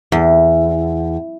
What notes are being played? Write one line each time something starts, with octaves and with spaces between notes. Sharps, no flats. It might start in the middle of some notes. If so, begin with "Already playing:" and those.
E2